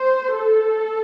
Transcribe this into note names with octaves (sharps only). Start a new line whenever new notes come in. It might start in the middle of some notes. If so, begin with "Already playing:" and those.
Already playing: C5
A4